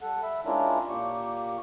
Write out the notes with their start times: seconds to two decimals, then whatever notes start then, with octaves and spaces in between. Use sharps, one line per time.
0.01 G3 A4 F#5
0.23 E5 B5
0.46 G#3 C#4 D4 E4 F4 A#4
0.89 A#2 A#3 G4 C#6